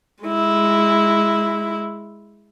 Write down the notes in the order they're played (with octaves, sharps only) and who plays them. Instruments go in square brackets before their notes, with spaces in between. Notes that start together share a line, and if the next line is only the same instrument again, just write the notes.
[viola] G#3 E4